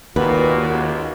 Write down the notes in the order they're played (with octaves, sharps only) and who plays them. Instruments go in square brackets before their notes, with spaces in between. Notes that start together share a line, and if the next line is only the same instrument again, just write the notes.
[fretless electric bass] D#2 [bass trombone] A#2 [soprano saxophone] F#4 [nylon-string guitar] B4
[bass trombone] C#2